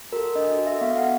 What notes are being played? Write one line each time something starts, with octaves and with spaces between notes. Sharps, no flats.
F#4 A4 A#4
D4 D#5
F#4 A4
E5
B3 F5
F#5